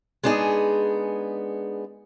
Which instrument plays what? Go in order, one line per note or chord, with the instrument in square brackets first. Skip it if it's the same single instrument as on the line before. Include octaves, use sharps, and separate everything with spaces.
[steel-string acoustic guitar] G#3 B3 D4 D#4 G#4